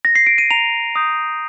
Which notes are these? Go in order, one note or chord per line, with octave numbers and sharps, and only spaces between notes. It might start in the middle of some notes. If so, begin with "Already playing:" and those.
A#6
C7
D7
D#7
A#5 F7
D#6 G6